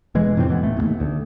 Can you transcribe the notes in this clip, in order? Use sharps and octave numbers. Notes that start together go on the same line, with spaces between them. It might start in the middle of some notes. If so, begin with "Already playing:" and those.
E1 E3 G#3
F2 A2 C3 C4
E3 B3
D#1 A3
D#1 D#2
D2